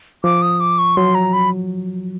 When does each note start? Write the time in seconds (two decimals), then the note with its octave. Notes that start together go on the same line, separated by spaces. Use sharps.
0.24 F3 D6
0.42 D#6
0.60 D6
0.79 C#6
0.97 F#3 C6
1.15 A#5
1.33 B5